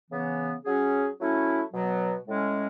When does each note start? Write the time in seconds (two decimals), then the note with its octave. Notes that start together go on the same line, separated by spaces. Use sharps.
0.10 C#3 E3 B3
0.64 F#3 C#4 G#4
1.19 F#3 A3 C#4 E4
1.73 B2 F#3 B3
2.27 A2 G#3 C#4